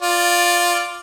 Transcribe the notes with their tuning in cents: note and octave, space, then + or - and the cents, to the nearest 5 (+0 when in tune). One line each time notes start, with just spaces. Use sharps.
F4 +5 D5 +0